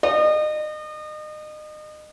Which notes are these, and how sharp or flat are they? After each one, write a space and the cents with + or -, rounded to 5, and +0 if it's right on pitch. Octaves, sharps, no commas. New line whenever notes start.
D#5 -35